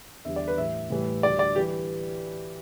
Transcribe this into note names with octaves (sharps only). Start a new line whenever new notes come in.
E2 D3 G3 E5
D5
B4
A2 E3 G3 E5
A2 E3 G3
D2 D3 G3 D5
D5
E3 G3 G4